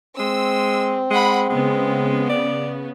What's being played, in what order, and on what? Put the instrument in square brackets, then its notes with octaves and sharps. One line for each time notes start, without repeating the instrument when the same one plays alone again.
[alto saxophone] G#3 [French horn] C4 [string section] E6
[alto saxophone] G#3 [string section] F#5 B5
[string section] C#3 B3 [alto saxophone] G#3
[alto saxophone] D5